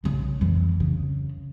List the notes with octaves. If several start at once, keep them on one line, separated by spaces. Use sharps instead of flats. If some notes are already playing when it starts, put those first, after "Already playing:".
B1 C#3
F2 E3
C#3